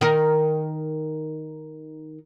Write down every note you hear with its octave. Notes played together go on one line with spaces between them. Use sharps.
D#3 A#4